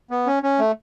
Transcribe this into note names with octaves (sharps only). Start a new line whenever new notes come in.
B3
C#4
C#4
A3